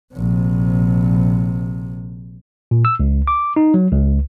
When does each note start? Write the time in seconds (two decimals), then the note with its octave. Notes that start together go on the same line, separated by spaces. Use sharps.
0.14 A#1 C3
2.71 A#2
2.85 E6
3.00 C#2
3.27 D6
3.56 D#4
3.74 F#3
3.92 C#2